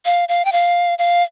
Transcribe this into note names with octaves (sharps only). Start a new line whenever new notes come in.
F5
F5
G5
F5
F5